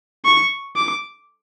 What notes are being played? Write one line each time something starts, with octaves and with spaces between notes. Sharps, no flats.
C#6
D6